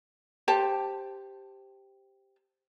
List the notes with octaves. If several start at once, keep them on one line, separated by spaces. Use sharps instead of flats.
G4 C5 A5